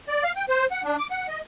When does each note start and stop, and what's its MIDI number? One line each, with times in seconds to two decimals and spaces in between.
0.08 0.23 74
0.24 0.32 77
0.36 0.45 79
0.49 0.66 72
0.71 0.82 78
0.84 0.96 62
0.99 1.07 86
1.11 1.27 78
1.28 1.41 75